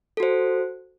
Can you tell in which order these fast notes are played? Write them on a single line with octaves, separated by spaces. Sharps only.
A4 F#4 C5